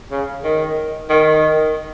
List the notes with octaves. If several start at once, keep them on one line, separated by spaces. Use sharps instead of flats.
C#3
D#3
D#3